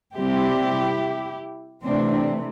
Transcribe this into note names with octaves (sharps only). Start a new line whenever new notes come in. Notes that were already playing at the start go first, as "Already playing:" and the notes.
C3 G3 C4 E4 G4
C3 E3 A3 C4 D4